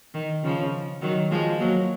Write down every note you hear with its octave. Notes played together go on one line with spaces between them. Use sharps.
D#3
C#3 F3
D#3 F#3
F3 G#3
F#3 A#3